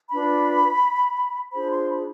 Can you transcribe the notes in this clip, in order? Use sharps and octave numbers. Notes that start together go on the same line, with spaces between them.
D4 F4 B4 B5
D4 F4 G#4 C5 B5
C6
B5